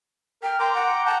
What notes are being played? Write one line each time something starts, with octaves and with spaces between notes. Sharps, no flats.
A#4 G5 F6
G5 A#5 C6 D6
F#5
F#5 G5 A5 A#5